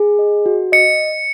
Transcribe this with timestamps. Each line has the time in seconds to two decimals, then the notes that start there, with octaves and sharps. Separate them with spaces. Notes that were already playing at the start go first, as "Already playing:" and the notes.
Already playing: G#4
0.19 D#5
0.46 F#4
0.72 D#5 C#7